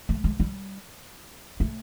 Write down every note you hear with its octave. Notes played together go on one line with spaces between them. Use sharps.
A3
G#3
G3
A3